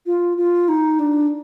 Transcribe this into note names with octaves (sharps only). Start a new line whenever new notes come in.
F4
F4
D#4
D4